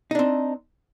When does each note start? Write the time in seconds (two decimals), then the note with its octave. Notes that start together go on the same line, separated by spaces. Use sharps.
0.11 D#4
0.15 D4
0.19 C4